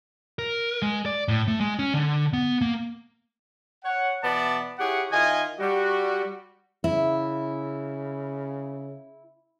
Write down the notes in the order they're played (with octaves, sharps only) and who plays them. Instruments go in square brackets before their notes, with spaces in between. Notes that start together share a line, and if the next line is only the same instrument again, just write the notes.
[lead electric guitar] A#4
G#3
D5
A2
A3
G#3
C#4
D3
B3
A#3
[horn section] C#5 F#5
B2 E3 B3 E4 D5 A5
E4 G4 G#4 C#5 F#5
D#3 E4 F4 D#5 G#5
G3 F#4
[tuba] C#3 [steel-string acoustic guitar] E4